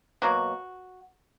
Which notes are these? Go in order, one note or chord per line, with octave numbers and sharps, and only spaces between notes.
B2 F#3 A#3 F#4